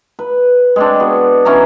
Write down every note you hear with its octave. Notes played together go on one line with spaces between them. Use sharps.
B4
G#3 C4 D4
B3 F#4
E3 C#4 E4 A#5